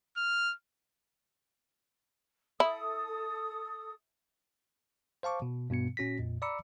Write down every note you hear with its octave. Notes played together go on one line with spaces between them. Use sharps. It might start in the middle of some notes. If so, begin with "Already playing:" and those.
F6
E4 A4 D#6
C5 F5 A5 C#6 D6
B2
G2 B2 B3 C#7
A#2 C#4 F#4 A#6 B6
F2 A#2
D5 A#5 B5 D6 E6 C#7